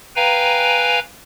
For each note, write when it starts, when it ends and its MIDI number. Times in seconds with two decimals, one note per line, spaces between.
0.16 0.99 71
0.16 0.99 77
0.16 0.99 79
0.16 0.99 80
0.16 0.99 82